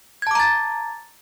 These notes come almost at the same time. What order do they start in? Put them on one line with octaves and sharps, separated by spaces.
G#6 A5 D6 A#5 A6